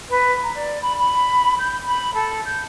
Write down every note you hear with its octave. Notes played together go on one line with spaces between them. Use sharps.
B4
A#5
D5
B5
B5
G6
B5
A4
G6